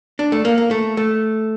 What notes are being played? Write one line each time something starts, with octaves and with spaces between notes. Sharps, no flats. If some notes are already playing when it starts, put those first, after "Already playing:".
D4
A3
A#3
A#3
A3
A3